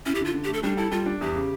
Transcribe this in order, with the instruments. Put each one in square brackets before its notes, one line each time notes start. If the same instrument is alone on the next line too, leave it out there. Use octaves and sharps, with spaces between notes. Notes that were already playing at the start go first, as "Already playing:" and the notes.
[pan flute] C#4 [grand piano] E4
[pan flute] G4
[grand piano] D3
[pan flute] F4
[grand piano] D3
[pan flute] G4
[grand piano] A3
[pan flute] A4
[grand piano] G3 [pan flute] D4
[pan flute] E4 [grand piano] A4
[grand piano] G3 [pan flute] F4
[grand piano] D4
[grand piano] E2 [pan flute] G4
[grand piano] C#3